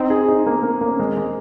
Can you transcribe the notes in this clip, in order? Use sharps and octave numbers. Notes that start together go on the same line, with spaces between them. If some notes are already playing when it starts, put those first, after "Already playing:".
Already playing: C4 D#4
G#4
D#4
A#3
A#3
A#3
C#4
G#3 C4
G#3